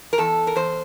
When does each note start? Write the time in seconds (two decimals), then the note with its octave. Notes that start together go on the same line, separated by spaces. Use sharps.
0.13 A#4
0.18 E2 A4
0.47 A#4
0.56 E2 C5